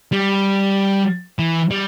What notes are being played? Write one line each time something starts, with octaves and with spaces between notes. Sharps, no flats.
G3
E3
G3